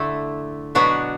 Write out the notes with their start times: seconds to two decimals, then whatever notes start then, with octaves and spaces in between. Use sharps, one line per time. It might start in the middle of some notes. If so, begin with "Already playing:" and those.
Already playing: D3 A3 E4 A4
0.75 B2 F#3 B3 D4 F#4